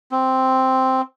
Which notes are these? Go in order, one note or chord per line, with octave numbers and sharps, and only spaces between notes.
C4